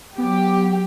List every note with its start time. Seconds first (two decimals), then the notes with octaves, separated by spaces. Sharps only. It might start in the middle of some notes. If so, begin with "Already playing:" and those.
0.18 F#3 B3 G4